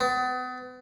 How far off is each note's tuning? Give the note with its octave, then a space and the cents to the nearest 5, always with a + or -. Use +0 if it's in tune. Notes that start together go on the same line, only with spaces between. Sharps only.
B3 +35